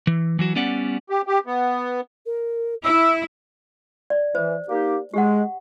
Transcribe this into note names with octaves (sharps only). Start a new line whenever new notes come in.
E3
E3 F#3 F#4
G3 B3 C#4 D5 F#5
G4
G4
B3
A#4
E4 E6
D5
E3 C5
A#3 D#4 G4
G#3 G4 F#5